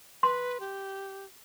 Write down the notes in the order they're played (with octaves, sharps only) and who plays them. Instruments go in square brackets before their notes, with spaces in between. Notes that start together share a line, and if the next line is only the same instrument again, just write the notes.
[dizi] B4 [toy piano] C6
[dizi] G4